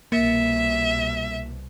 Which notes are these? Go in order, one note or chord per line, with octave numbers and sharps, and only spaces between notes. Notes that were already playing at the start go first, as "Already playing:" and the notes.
C2 B2 A#3 E5